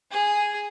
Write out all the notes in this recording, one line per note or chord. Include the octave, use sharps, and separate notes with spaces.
G#4